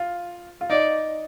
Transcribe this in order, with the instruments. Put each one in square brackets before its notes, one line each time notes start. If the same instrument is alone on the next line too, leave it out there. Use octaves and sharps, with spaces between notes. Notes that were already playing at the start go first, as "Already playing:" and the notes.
Already playing: [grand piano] F4
F4
[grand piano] D#4 [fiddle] D5